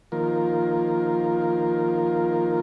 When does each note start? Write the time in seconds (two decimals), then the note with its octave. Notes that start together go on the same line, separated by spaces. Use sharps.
0.12 D#3 F3 A#3 F4 A#4